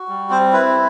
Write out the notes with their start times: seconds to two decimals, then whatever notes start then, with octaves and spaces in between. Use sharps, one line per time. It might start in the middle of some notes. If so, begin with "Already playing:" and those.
Already playing: F#4
0.08 G3
0.30 C4 C5
0.53 E4 B4